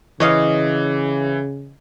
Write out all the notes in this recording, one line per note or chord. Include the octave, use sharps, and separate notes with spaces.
C#3 E3 C#5 D#5 F5